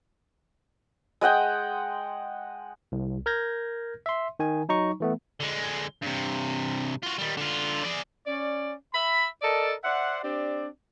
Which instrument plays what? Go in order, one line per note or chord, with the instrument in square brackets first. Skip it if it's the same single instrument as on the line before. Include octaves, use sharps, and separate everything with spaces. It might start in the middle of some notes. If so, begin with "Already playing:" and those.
[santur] G#3 D#5 F#5 G5
[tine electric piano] C2
A#4 F6 G6 G#6 A#6
E5 C6
D#3 G#5
F#3 D#4 A#5 C#6
E3 A3 B3
[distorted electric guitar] D3 G#3
G2 C3
F4 F#4
D#3 G3
D3 F4
G#4 D5
[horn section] C#4 D5
E5 B5
A4 A#4 D5 D#5 A5
C5 D5 E5 F#5
C4 D4 G4 D5